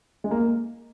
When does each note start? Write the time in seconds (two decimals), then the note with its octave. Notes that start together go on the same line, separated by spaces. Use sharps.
0.24 G#3
0.31 A#3